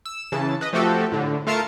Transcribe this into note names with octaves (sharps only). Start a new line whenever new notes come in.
E6
C#3 E3 A5
B4 D#5
F3 A3 C4 F#4 G4 A4
A2 D3
A3 F4 A#4 F5 A5 C#7